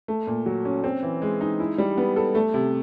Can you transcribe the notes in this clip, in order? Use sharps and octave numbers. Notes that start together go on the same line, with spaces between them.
A3
A#2
F#3
C#4
C4
E3
G#3
D#4
E4
G3
B3
A4
A3
C3